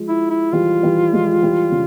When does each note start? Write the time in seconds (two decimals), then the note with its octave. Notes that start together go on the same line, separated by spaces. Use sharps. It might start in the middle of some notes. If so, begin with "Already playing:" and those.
Already playing: F3 G#3
0.08 E4
0.30 E4
0.52 E3 G3 F4
0.83 E3 G3
1.13 F3 G#3
1.42 E3 G3
1.71 C#3